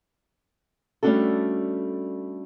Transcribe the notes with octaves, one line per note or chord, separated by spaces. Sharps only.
G3 A3 C#4 D4 F#4 A4